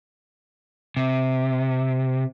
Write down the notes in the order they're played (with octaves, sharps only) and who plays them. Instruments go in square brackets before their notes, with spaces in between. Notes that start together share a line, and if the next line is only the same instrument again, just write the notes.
[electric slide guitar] C3